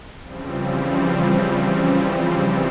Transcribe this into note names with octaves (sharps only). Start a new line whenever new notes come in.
C#3 E3 F3 G3 C4